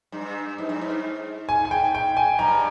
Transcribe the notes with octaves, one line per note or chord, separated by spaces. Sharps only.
G2
G#2
G2
G#2
G#5
G#5
G5
G5
G#5
G2 A#5